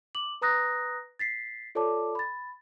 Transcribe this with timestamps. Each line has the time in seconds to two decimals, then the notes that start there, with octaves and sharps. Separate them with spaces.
0.15 D6 F#7
0.42 B4 A#5 D#6 F#6 A#6
1.19 A6 B6 C7
1.75 F4 A4 C#5 D5 A5 D6
2.15 B5 A6